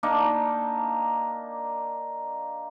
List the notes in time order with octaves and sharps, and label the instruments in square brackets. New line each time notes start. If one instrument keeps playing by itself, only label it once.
[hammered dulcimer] A#3 D4 D#4